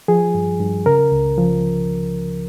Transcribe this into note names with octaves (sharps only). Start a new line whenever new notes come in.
F3 G#4
G2
G2
C#3 A#4
C#2
F3